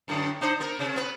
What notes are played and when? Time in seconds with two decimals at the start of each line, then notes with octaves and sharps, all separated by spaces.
0.08 F#2 A2 D3
0.41 D4 D#4 C5
0.60 B3 A#4
0.79 C3 C#4
0.96 B3 B4